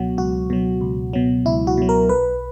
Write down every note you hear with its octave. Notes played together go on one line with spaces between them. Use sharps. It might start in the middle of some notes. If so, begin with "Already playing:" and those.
Already playing: C#2 B2 F#3 F#4
C#2 F#4
B2 F#3
C#2
B2 F#3
C#2 E4
F#4
B2 F#3
A#4
B1 B4